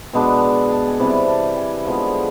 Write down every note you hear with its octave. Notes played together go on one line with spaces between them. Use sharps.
B2 G#3 B3 D4 A5
A5
A5
G#5
C3 E3 G3 A5
A5
G#5
D3 F3 G#3 B3 F5
E5